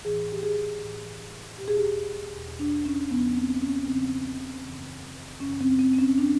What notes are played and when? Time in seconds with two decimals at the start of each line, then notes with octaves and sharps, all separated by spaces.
0.05 A2 E3 G#4
0.32 G4
0.43 G#4
0.81 A2 E3
1.58 E2 B2 G4
1.68 G#4
1.77 G4
2.35 E2 B2
2.59 D4
2.85 C#4
3.11 E2 C#3 F3 B3
3.36 C4
3.62 C#4
3.88 E2 C#3 F3 C4
4.64 F#2 C#3 E3
5.40 F#2 C#3 E3 C#4
5.61 C4
5.79 C4
5.93 C4
5.99 C#4
6.18 F3 D4